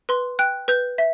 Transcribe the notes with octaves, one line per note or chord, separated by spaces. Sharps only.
B4 C6
G5 F#6
B4 G6
E5